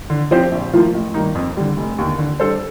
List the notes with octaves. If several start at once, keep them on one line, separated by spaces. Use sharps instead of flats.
D3
F3 C4 G4 C5
A#1
A2 F3 A#3 F4
A1
G2 D#3 A#3 D#4
F2
D3 G3
F1
D#2 D3
D3
G3 D4 A4 C5